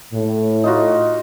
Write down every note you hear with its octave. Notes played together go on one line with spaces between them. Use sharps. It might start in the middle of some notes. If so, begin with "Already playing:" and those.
A2
D#4 F4 F#4